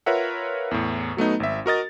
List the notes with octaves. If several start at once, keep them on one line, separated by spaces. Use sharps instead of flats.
F4 A#4 B4 C#5 E5 F#5
E2 A2
F#3 A3 B3 D#4
G#1 E5
F#4 A#4 D#5 A6